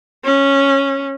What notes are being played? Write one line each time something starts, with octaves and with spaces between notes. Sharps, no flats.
C#4